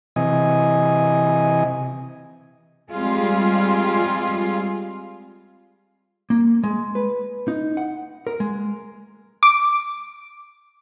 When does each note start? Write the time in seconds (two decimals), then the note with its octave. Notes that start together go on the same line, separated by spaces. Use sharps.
0.16 C3 E3 D#5 G#5
2.91 G3 G#3 C4 F4 G#4
6.30 A#3
6.64 G#3
6.95 B4
7.48 D#4
7.77 F#5
8.27 A#4
8.40 G#3
9.43 D6